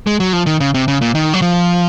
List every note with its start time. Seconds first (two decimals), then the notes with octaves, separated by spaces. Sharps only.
0.07 G#3
0.20 F#3
0.33 F3
0.46 D#3
0.60 C#3
0.74 C3
0.88 C#3
1.01 A#2
1.15 D#3
1.34 F#3
1.42 F3